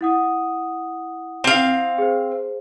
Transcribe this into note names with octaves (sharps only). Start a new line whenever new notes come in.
E4 F#5 D#6
C4 F5
G#4 C5